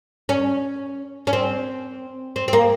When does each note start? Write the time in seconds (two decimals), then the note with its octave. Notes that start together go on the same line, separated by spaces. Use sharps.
0.29 C#4
1.27 C#4
1.33 C4
2.36 C4
2.48 C4
2.53 A#3